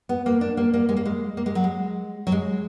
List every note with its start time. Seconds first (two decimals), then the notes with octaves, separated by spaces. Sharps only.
0.09 B3
0.26 A#3
0.41 D4
0.57 A#3
0.74 A#3
0.89 G#3
0.97 A#3
1.06 G#3
1.37 A#3
1.46 G#3
1.55 F#3
1.64 G#3
2.27 F#3
2.32 G#3